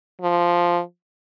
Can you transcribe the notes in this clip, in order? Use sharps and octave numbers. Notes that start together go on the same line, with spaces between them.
F3